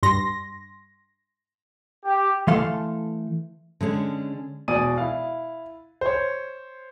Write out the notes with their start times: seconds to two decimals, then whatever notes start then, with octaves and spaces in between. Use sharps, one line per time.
0.03 G2 C6 A#6
2.04 G4
2.47 E3 A3 A4 F5 C6
3.81 D3 G#3 C#4 D4
4.68 E1 B2 D5 G#5 D#6 D#7
4.98 E4 F5
6.01 C5 C#5